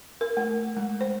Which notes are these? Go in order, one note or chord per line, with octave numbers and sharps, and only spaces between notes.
A#4
A3
G#3
C5